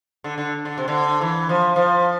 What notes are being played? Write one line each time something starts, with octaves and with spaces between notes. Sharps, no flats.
D3
D3
D3
C3
D3
E3
F3
F3